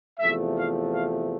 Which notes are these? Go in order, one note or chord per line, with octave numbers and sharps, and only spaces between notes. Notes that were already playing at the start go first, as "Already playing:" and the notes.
E2 C3 F3 A3 E5
F5
F5